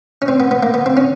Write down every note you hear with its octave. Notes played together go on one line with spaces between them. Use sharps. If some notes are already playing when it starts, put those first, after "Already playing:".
C#4
C4
B3
B3
A#3
B3
C4
C#4